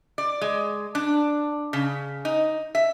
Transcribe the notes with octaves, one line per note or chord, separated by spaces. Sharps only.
D5
G#3
D4
C#3
D#4
E5